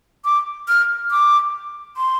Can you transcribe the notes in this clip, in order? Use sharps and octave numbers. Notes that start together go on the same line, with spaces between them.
D6
F6
D6
C6